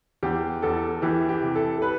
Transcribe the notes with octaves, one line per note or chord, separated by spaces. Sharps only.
E2 G4
E2 A4
E3 G4
G4
C3
A4
A4
B4